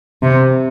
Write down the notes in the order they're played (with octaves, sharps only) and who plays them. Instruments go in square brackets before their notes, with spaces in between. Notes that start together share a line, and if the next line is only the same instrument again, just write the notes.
[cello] C3